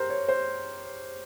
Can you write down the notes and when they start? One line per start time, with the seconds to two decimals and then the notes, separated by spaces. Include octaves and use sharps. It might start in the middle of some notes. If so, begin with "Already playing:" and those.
Already playing: G4 A#4 C5
0.10 C#5
0.28 C5